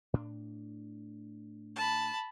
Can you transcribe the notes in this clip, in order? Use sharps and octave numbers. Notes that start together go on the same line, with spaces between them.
A2 D4
A5 B5